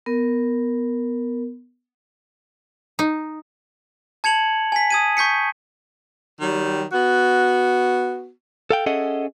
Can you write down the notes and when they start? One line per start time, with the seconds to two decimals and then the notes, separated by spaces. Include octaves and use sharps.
0.06 B3 A#4
2.99 D#4
4.24 A5 G#6 C#7 F7 F#7
4.72 G#5 B6
4.91 D#6 G#6 D#7
5.17 C#6 G6 B6 C#7
6.41 D#3 F#3 G3
6.92 B3 F#4
8.71 A4 F5 G5
8.86 C#4 G#4 A4 D#5 E5 F#5